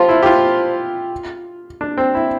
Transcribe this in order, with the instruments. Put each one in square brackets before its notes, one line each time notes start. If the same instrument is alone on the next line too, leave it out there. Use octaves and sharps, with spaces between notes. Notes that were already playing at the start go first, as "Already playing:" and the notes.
Already playing: [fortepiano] F4 G4 [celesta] C5 F5 A5 C6
[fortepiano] E4
G4
F4
D4
C4
E4